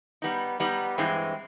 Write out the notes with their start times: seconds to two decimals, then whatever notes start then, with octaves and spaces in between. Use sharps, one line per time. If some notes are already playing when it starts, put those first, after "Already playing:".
0.22 G3 B3 D#4
0.60 G3 B3 D#4
0.98 G2 E3 G#3 C4